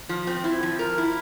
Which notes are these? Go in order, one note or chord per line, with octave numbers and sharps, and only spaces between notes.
F3
C4
E4
F3
A#4
E4